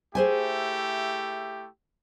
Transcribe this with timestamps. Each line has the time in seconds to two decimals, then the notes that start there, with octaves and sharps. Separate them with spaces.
0.15 A3 E4 G4 G#4 C5 G#5